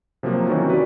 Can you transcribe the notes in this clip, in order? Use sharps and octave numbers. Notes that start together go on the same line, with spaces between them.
C3 F3 F#3 A#3
D#3 E3 F#3 C4 C#4 F#4
B4 D5